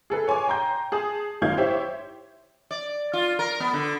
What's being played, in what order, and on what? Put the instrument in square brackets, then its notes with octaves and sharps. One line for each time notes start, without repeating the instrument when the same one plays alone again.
[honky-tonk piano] G#4 A4 B4
C#5 G#5 C6 D6
G5 A#5 C6 G6
G#4 A5 D#6
G#1 F#2 D#3 F5 G6 G#6
E4 G4 C5 C#5 E5
[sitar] D5
F4
A#4
B3
D3